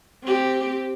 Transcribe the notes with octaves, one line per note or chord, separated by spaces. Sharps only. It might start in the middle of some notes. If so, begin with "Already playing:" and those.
C4 G4